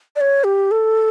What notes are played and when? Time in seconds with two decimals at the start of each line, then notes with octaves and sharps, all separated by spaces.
0.16 D5
0.21 C#5
0.44 G4
0.71 A4